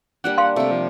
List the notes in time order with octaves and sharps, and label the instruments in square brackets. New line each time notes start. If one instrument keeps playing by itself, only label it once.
[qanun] G3 A#3 D4 [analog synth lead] F#5
[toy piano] F5 C6
[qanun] C3 A#3 [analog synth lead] A3
[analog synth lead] F3